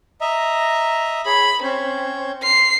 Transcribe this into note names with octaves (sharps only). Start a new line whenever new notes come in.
D#5 E5 A#5
G#4 C#5 B5
C4 C#4 C#5 G6
C6 F6 C7